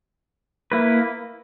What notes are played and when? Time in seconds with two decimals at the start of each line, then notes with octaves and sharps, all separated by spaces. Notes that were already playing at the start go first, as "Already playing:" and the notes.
0.72 A#3 E4 B4